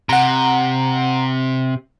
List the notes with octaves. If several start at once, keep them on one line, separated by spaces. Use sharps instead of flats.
C3 F#5 A#5